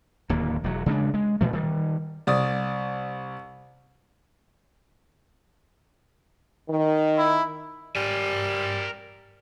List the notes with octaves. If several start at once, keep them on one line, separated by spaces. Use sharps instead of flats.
D1 D#2 A#3
E1 F#3
C#3 G#3 C4 D4
G#3
A#2 E3 A3
D#3 G3
C2 D5 D#6
D#3
E4
G3 A#4 G#5